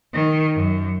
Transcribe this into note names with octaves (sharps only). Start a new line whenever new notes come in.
D#3
F#2